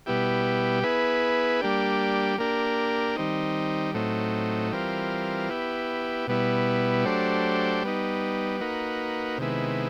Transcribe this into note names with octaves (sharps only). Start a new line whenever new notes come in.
B2 G3 B3 E4 G4
B3 E4 G#4 B4
G3 A#3 D4 G4
A#3 D4 G4 A#4
D#3 G3 C4 D#4
A2 F#3 A3 C4 D#4
E3 G3 C4 F4 A#4
B3 E4 G4
B2 G3 B3 E4
F#3 A3 D4 G4 C5
G3 B3 D#4
A#3 D#4 F#4 B4
C3 D#3 G#3 B3 E4